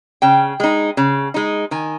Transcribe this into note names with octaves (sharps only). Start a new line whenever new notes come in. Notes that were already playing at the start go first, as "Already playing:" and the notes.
C#3 G5
G#3 D#4
C#3
G#3 D#4
D#3 G#5